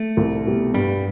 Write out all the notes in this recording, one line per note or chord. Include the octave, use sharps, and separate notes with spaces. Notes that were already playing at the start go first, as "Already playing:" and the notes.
Already playing: A3
C2
B2 G3
G2 G3